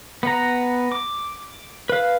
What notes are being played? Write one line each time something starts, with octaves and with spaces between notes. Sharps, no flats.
B3 F#5 A#5
D6
B4 F5